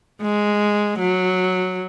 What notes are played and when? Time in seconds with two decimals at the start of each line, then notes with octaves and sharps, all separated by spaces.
0.22 G#3
0.99 F#3